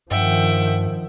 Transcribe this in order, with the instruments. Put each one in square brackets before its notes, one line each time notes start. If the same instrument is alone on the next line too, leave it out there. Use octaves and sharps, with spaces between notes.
[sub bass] G2 [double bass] D#3 F3 [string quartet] E5 F#5 G5